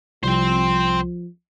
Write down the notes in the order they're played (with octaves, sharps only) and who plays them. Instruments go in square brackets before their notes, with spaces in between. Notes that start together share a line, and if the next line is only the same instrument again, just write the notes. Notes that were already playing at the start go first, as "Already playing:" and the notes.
[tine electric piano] C2 [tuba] F3 [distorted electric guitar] C5 G5